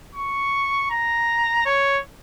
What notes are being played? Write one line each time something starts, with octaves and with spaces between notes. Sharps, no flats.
C#6
A#5
C#5